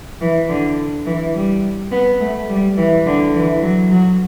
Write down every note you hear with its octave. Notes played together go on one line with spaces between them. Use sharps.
E3
D3
E3
G3
B3
A3
G3
E3
D3
E3
F#3
F#3